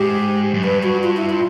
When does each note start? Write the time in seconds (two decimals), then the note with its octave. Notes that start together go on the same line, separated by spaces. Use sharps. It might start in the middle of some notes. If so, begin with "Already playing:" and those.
Already playing: G#2 G4
0.54 F#2
0.64 G2 B4
0.84 F#4
1.03 F4
1.17 E4
1.30 F4